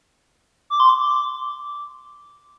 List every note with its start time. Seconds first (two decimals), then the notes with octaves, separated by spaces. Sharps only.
0.70 D6
0.80 C6
0.89 D6